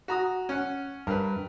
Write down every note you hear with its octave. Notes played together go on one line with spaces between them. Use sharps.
F#4 A#5 D#6
C#4 F#5
G2 A#4 B4